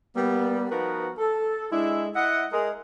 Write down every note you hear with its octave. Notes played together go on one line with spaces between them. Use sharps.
G3 A#3 B3
F3 B3 D#4 F#4 A#4 B4
A4
G#3 D4 E4
E4 D#5 E5 F#5
G#3 G#4 A#4